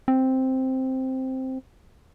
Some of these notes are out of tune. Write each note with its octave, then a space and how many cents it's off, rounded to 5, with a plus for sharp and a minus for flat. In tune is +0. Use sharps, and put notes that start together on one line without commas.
C4 +0